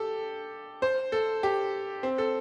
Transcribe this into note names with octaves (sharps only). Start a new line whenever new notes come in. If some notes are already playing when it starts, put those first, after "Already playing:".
Already playing: G4 A4
C5
A4
G4
C4
A4